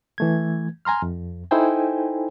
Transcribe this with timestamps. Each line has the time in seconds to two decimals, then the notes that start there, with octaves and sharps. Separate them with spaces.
0.18 E3 A3 G#6
0.85 G#5 A#5 C6 F6
1.02 F2
1.51 D#4 E4 A4 C5 G5 G#5